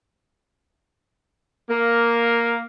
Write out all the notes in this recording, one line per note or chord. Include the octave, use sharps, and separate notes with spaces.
A#3